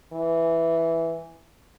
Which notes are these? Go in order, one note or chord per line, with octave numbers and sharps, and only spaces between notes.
E3